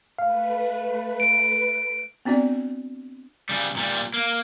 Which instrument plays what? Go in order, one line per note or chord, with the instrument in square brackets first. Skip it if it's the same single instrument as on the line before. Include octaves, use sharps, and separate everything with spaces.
[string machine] A3 B4 [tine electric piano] F5
[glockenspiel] D7
[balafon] B3 C4 D4 F#4 D5
[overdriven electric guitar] C#3 G3
A#2 G3
A#3